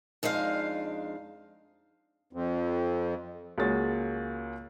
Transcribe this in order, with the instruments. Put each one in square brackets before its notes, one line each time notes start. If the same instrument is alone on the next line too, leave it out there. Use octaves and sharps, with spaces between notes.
[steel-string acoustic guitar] F2 G#3 D4 D#4 F4 F5
[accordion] F2
[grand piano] C#2 A#3 F#4 G#4 C#5 A6